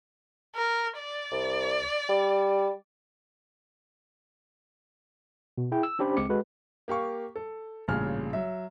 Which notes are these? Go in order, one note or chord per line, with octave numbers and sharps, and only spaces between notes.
A#4
D5
C2
G3
B2
E4 G#4 G5
E6
C#4 D4 G4 C5 B5
C#2 G#3 C4 D6 C#7
G#3 F#4 A4 B4
A#3 G4 F5 C#6
A4
A1 G2 A#2 C#3 G#4 F6
F#3 E5